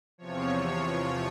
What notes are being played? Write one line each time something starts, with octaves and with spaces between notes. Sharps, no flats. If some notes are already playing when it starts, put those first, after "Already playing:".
E2 C3 F3 C#5